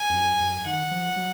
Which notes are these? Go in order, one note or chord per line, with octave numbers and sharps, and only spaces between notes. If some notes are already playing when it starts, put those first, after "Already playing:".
Already playing: G#5
F2
F#2
F#2
D#3 F#5
F3
F#3